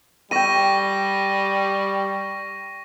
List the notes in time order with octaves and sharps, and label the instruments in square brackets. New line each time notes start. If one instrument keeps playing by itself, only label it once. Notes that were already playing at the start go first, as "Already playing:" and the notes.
[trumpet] G3 [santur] G5 E6 [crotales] C#6 A#6 D#7